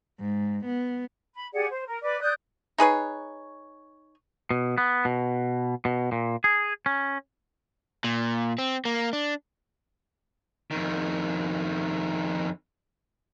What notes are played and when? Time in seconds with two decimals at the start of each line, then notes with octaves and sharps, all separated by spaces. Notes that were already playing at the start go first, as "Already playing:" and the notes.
0.20 G#2
0.66 B3
1.34 B5
1.53 G4 G#4 D5 F#5
1.69 C5
1.87 A#4
2.02 B4 D5 D6
2.20 D5 D#6 F#6 G6
2.78 D#4 G#4 B4 C#5
4.51 B2
4.78 B3
5.05 B2
5.85 B2
6.12 A#2
6.44 G#4
6.86 C#4
8.04 A#2
8.58 C4
8.85 A#3
9.13 D4
10.71 F2 D#3